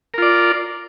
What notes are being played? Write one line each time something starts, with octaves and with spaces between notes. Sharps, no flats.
F4 A#4 D5